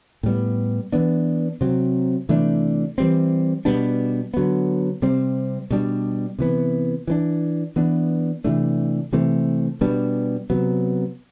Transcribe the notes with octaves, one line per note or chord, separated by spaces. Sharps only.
A2 G3 B3
E3 B3 D4
C3 F#3 C4
C3 E3 A3 D4
E3 G3 C4
B2 G3 B3 D4
D3 F#3 B3
C3 G3 C4
B2 G3 D4
C3 E3 B3
E3 B3 D4
E3 B3 D4
C3 E3 A3 D4
C3 E3 A3 C4
B2 G3 B3 D4
C3 F#3 B3